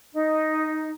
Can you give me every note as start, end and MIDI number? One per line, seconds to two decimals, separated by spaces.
0.12 0.90 63